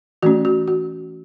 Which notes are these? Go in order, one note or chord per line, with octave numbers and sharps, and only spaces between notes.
E3 A3 C#4 F#4
F#4
F#4